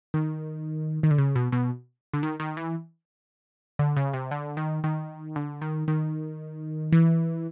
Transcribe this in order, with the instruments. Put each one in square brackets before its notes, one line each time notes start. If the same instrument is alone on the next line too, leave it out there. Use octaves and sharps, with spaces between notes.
[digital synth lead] D#3
D#3
D3
C#3
B2
B2
D3
D#3
D#3
E3
D3
C#3
C3
D3
D#3
D#3
D3
D#3
D#3
E3